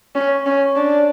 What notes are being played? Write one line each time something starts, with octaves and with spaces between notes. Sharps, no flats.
C#4
C#4
D4